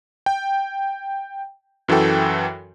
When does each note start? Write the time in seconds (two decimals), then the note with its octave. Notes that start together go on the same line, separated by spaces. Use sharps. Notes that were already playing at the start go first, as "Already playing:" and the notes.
0.26 G5
1.88 F#2 E3 F#4 A4 G5